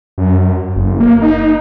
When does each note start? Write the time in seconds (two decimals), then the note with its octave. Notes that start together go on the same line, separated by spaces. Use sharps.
0.18 F#2
0.76 F#1
1.00 A#3
1.22 D#4